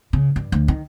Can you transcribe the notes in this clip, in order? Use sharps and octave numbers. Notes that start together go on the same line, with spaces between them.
C#3
G2
D2
D#3